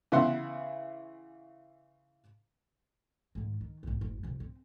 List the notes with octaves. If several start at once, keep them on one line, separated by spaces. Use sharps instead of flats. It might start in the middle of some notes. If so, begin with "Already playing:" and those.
C#3 E3 E4 F#5 C6
G#2 D#3
D#3
B1 G#2
F#1
D#1 C3
C4